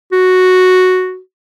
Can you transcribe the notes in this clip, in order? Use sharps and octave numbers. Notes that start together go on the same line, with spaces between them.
F#4